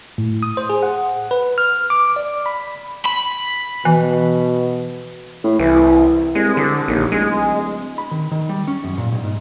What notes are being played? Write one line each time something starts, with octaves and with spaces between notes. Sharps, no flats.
A2
D#6
C5
G#4
F#5
B4
F6
D6
D5
B5
B5
B2 E3
A2
C2 E3
C2 G#3
D3
A#1 D#2
D1 G#3
B5
D#3
D#3
G3
C#4
F#2
A#2
B1
G#2